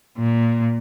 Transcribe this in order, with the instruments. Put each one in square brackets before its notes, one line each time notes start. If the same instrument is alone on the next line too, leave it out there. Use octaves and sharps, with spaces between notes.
[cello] A#2